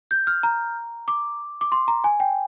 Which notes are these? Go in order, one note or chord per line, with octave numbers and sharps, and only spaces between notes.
G6
F6
A#5
D6
D6
C6
A#5
G#5
G5